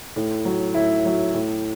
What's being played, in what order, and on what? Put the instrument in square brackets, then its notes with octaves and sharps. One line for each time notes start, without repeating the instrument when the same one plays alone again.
[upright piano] A2
F#3
A2 E4
F#3
A2